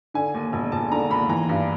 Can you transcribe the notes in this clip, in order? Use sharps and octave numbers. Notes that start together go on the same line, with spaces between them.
D3 G#5
D#2
E1
E1 A5
D3 A#5
D#2 B5
E3 A#5
G2